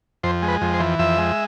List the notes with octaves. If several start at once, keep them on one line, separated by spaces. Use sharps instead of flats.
F2 C5
G#3
B4
F2
C5
E3
F2 E5
G#3